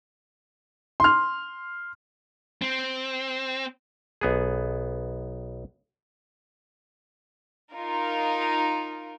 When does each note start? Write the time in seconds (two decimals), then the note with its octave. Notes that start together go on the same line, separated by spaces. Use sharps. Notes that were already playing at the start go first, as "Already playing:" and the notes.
1.00 C6 F6
2.62 C4
4.21 B1 B3 G#4
7.74 D#4 F4 A#4